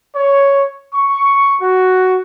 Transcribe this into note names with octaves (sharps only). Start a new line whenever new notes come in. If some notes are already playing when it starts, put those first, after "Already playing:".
C#5
C#6
F#4